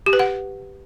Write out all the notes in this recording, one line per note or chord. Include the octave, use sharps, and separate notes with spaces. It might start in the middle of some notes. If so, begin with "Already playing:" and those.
G4
B4
F#5